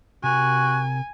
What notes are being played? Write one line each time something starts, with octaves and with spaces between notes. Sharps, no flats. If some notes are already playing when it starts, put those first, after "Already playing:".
C3 F#4 A#4 G#5